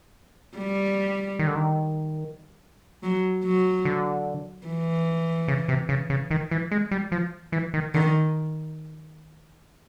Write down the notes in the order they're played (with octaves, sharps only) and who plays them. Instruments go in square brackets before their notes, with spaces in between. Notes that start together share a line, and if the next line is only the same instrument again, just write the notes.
[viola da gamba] G3
[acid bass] D#3
D3
D#3
[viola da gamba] F#3
F#3
[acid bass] D3
[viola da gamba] E3
[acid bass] C#3
C3
C#3
C#3
D#3
E3
G#3
G3
F3
E3
D#3
[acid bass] D3 [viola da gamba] D#3